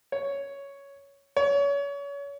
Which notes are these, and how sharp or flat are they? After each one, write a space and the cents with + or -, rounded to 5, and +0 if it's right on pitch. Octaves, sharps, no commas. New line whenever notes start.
C#5 +5
C#5 +30